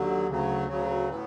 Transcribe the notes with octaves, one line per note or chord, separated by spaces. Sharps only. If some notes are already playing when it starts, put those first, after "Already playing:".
Already playing: D#2 D3 F#3
D2 C#3 F#3
D2 C#3 F#3
A2 B3